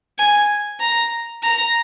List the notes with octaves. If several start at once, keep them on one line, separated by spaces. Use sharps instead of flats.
G#5
A#5
A#5